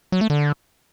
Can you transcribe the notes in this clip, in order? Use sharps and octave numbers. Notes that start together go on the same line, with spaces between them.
F#3
A3
D3